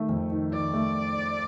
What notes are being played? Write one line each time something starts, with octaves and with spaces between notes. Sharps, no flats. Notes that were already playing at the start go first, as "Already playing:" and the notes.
Already playing: D#3 A3
F2
D#3
D#3 D5
A3